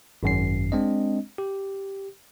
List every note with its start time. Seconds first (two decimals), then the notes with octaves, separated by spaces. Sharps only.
0.23 G#1 F#2 C7
0.72 G#3 C4 D4 D#5
1.38 G4